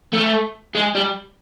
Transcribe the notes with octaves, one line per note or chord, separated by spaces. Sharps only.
A3
G#3
G3